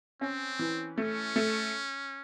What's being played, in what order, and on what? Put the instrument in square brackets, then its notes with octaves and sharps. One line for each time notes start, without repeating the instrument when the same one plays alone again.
[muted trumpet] C4 [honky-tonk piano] C#4
[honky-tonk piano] E3
[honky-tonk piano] A3 [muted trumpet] C#4
[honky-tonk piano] A3